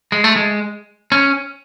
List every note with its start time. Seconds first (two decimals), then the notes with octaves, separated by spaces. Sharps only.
0.12 G#3
0.24 A3
0.36 G#3
1.12 C#4